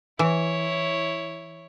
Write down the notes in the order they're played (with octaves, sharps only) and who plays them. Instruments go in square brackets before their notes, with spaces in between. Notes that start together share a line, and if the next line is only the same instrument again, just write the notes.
[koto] E3 [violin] E4 C#5